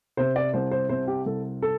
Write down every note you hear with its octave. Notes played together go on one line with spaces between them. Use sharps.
C3 C5
D5
C2 C5
C5
C3 C5
G4
C2 A4
A4